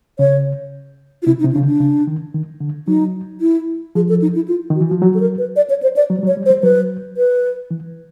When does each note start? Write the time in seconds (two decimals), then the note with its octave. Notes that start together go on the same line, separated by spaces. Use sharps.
0.19 C#3 C#5
1.23 F4
1.26 C3 E4
1.40 D#4
1.44 C3
1.53 D4
1.56 C#3
1.62 D3
1.67 D4
1.80 C#3
2.07 D#3
2.34 D#3
2.60 D3
2.88 F#3 D#4
3.41 E4
3.95 F3 G#4
4.09 A4
4.22 D#4
4.35 E4
4.48 F4
4.70 D#3
4.76 F#4
4.81 E3
4.89 F#4
4.91 F3
5.02 F#3 F#4
5.14 A4
5.20 A#4
5.38 B4
5.56 D5
5.70 C#5
5.83 C5
5.96 D5
6.10 F#3
6.19 G3
6.23 F#3
6.27 C#5
6.37 G3
6.46 C5
6.50 G3
6.63 F#3 B4
7.17 B4
7.71 E3